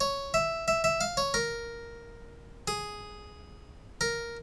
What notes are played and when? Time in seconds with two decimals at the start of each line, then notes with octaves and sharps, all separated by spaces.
0.01 C#5
0.34 E5
0.68 E5
0.84 E5
1.01 F5
1.17 C#5
1.34 A#4
2.68 G#4
4.01 A#4